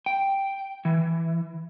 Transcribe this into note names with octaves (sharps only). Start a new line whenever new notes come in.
G5
E3